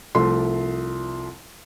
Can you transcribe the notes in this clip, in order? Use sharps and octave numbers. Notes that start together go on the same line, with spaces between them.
C2 F3 A3 C6